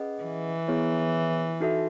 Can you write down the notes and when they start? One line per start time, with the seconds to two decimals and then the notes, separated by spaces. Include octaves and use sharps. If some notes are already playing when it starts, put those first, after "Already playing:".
Already playing: C#4 G#4 B4 D#5 F#5
0.23 E3
0.68 B3 E4 G#4 C#5
1.60 D#4 F#4 A4 E5